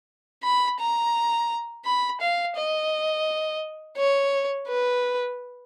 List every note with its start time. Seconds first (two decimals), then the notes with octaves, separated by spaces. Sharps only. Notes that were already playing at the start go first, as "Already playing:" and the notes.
0.43 B5
0.79 A#5
1.85 B5
2.20 F5
2.56 D#5
3.97 C#5
4.68 B4